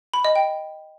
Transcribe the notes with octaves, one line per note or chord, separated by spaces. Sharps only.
B5
D#5
G5